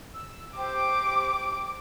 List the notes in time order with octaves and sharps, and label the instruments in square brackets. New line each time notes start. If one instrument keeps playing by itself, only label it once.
[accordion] E6
[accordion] G4 C5 [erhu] D6